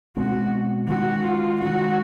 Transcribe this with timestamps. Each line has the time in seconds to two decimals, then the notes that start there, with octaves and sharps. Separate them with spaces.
0.17 B2 G#3 C4 F#4
0.88 D#3 G#3 C#4 F#4
1.24 F4
1.61 D#3 G#3 C#4 F#4